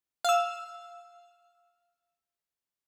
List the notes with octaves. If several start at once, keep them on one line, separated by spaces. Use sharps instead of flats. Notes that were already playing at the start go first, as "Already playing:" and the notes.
F5 E6